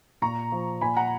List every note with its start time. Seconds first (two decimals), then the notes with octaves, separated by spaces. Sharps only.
0.22 A#2 A#5 C#6
0.52 F3
0.81 A#2 G#5 B5
0.97 F#5 A#5